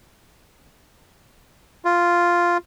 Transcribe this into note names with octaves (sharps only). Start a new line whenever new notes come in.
F4